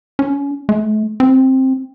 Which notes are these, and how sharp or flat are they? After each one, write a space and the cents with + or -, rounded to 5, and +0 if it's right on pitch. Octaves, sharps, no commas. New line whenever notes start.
C#4 +25
A3 -40
C4 +10